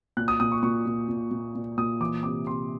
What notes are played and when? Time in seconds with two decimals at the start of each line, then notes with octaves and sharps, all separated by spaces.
0.17 A#2 F#6
0.28 D#6
0.40 A#2 D#6
0.52 C#6
0.63 A#2 C#6
0.86 A#2
1.09 A#2
1.31 A#2
1.55 A#2
1.78 A#2 D#6
2.00 E3 D6
2.23 C3 D6
2.46 C3 C6